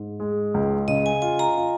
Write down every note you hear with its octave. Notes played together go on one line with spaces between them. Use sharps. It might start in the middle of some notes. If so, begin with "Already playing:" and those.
Already playing: G#2
G#3
C#2
C#3 D#5
G#5
F4 G#5
A#5
F4